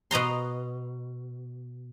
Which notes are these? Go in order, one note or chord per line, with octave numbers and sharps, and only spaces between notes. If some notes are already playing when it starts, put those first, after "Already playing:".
B2 D#5 A#5 C6